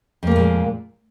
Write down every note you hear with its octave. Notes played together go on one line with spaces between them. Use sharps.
F2 A#2 G#3 A#3